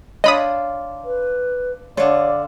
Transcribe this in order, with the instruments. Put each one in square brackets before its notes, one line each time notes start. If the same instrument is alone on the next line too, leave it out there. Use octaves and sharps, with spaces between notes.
[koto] D4 F4 [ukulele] C#5 [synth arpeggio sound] D#5 B5 D#6
[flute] B4
[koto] D3 F4 [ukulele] C#5 [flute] D5